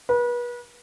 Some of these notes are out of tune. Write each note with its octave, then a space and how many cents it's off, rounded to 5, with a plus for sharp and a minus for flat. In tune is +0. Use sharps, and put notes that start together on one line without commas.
B4 -35